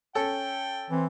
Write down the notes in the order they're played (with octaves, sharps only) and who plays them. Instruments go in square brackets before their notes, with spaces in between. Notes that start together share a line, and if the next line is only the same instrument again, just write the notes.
[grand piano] C#4 A4 [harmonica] G5
[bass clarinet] E3 [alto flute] C4